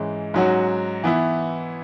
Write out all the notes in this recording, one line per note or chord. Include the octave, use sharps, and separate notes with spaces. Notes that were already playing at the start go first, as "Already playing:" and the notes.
Already playing: G#2 E3 G#3 C#4
G#2 F#3 C#4 F#4
E3 B3 E4